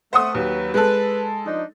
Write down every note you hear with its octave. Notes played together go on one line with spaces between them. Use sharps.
A3 C5 F#5 D#6
D#2 F#3 B4
G#3 A4 B4
F3 D4 D#4